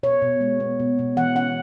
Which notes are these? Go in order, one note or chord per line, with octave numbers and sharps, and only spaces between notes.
B2 C#5
B2
G#3
B3
B2
B2
E3 F#5
C#4 F#5